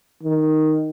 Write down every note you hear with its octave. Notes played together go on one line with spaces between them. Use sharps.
D#3